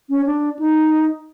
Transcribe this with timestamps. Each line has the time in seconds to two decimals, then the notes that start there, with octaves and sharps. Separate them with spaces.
0.10 C#4
0.26 D4
0.59 D#4